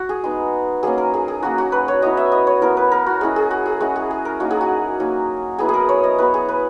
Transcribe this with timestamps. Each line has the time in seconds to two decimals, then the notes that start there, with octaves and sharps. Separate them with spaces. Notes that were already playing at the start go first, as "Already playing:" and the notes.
Already playing: F#4
0.09 G#4
0.24 G#3 B3 D#4
0.83 F#3 A#3 C#4 G#4
0.98 A#4
1.14 G#4
1.28 G#4
1.43 F#3 A#3 C#4 F#4
1.58 F#4
1.72 B4
1.88 C#5
2.02 F#3 B3 E4 D#5
2.17 E5
2.32 D#5
2.47 C#5
2.61 F#3 B3 E4 A#4
2.77 B4
2.92 A#4
3.06 F#4
3.21 G#3 C#4 E4 G#4
3.36 G#4
3.51 F#4
3.66 G#4
3.80 G#3 C#4 E4 F#4
3.96 G#4
4.11 G#4
4.25 A#4
4.40 F#3 A#3 D#4 F#4
4.51 G#4
4.61 F#4
5.00 F#3 A#3 D#4
5.58 F#3 B3 E4 G#4
5.69 G#4 A#4
5.89 C#5
6.04 D#5
6.18 F#3 B3 E4 B4
6.34 G#4
6.49 B4